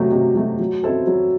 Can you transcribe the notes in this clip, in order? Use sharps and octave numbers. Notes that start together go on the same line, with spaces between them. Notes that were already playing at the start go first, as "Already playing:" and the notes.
Already playing: C3 F#3 A3
C3
F#3 A3
F#3
C4 E4 A4 C5
F#3